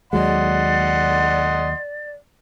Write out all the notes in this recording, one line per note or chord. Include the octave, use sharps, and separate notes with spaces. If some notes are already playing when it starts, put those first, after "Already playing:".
D#2 F#3 G#3 D5 D#5 F#5 C6